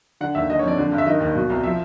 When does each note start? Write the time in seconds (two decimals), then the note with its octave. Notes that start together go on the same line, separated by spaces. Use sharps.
0.21 D3 F#5
0.35 D#2 E5
0.50 D3 D#5
0.59 C#5
0.63 F2 D5
0.77 D3
0.92 G2
0.98 E5
1.06 D#3 D#5
1.20 D#2
1.35 B2
1.50 C2
1.64 F3 E5